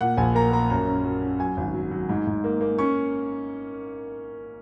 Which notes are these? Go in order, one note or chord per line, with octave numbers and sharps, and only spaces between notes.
A#2 F#5
A#1 G#5
A#3 A#5
A#3 A#5
F#2 A#5
C#4
F#3
C#4
F#3 G#5
G#1
F#3
F#3
G#2
G#2
A#3
A#3
C#4 C#6